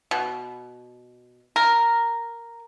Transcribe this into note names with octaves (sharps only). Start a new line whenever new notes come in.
B2
A#4